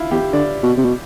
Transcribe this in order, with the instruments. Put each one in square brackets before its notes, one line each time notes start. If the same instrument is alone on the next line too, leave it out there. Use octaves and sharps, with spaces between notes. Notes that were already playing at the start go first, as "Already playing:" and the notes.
Already playing: [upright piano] E4 F4
[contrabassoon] E2 [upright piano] G4
[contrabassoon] D3 [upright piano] D5
[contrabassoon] B2
C3
B2